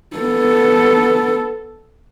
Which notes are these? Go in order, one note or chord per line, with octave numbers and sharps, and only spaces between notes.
B3 A4